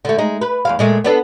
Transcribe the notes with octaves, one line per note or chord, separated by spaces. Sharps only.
D3 A3
G#3 D#4
B4
E2 G#3 F5
A#2 G#3 A3
B3 D4 A4